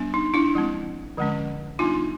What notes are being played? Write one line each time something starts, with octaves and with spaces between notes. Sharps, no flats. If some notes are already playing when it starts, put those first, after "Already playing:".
Already playing: G3 B3 D4
D#4
D4 E4
F3 G#3 C4
D3 F3 G#3 C#4
G3 B3 D4 D#4 F4